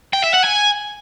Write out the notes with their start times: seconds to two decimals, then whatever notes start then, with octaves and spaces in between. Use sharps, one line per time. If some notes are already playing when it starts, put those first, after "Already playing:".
0.13 G5
0.23 E5
0.34 F#5
0.44 G#5